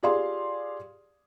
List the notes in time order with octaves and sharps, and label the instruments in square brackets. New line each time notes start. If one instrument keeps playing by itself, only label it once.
[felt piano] F4 G4 G#4 D5 F5 C6